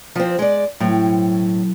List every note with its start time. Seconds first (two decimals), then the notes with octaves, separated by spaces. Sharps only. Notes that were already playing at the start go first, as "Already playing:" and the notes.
0.16 F3 C4
0.39 G#3 D5
0.80 A2 F#3 C4 G6
1.05 B2 C#4